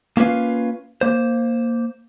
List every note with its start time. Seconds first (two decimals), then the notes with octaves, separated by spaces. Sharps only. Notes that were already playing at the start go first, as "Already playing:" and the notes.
0.17 A#3 C#4 F4 B4 F5
1.01 A#3 C5